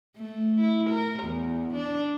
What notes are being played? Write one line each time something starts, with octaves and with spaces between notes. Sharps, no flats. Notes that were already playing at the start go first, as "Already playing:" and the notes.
A3
E4
A#4
E2
D4